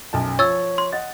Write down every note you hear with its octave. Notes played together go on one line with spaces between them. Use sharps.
B1 F#2 A5
F3 C#5 E6 A6
C6
D#5 F#5 A6